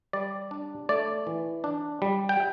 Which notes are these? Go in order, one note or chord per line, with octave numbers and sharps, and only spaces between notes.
G3 D5
D4
A3 D5
E3
D4
G3
G5